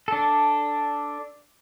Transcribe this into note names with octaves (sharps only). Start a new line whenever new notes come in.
D4 A4